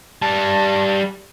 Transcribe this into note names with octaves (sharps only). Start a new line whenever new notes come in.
G3 A5